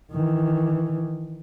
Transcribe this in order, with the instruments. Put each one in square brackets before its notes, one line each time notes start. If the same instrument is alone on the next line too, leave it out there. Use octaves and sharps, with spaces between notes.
[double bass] D#3 E3